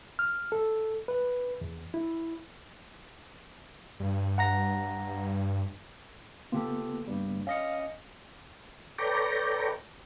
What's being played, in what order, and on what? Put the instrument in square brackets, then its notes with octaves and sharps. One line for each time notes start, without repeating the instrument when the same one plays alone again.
[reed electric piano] F6
A4
B4
E2
E4
[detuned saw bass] G2
[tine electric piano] F#5 A#5 A#6
[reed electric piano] C#3 A#3 B3 [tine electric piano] F4 G4 A4
[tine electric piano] G2 G3
[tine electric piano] C#4 D#5 C#7 [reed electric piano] F5
[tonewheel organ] A4 B4 C#5 D5 G5 A#5